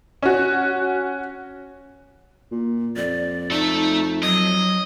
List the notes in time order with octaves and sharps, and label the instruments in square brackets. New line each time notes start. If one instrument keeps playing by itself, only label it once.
[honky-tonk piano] C#4 F#4
[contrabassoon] A#2
[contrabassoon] F2 [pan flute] D5
[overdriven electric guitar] A3 A4 [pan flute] D#4
[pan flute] F#3 [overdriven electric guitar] D#5